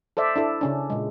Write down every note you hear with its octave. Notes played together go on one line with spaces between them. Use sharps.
A4 C5 D5 E5
D4 E4 A4
C#3 C#4 D4
A#2 G#3